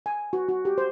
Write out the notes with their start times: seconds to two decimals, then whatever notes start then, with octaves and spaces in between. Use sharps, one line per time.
0.06 G#5
0.33 F#4
0.49 F#4
0.65 G4
0.78 C5